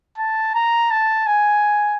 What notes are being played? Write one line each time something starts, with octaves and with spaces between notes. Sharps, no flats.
A5
A#5
A5
G#5